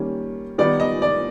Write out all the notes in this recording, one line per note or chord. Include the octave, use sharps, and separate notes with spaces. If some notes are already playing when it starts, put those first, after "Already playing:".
Already playing: D#3 G3 A#3 C#4
D#3 G3 B3 D#4 D5
D#5
D5